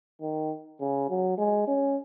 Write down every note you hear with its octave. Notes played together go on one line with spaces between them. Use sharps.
D#3
C#3
F#3
G#3
C#4